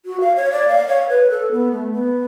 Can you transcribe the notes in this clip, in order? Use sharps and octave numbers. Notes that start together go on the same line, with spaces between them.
F#4
F5
C#5
D5
F5
C#5
B4
A4
B3
A3
B3